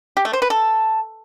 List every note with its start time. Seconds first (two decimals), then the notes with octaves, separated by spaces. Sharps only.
0.17 G4
0.25 A3
0.33 C5
0.42 B4
0.50 A4